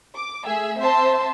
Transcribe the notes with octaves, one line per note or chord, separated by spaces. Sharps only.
D6
A3 G#4 E5
C4 C5 E5 A5 C6